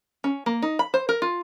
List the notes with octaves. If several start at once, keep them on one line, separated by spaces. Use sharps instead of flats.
C#4
A#3
D#4
B5
C5
A#4
F4